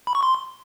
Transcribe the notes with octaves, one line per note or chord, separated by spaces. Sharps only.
B5
C#6
C6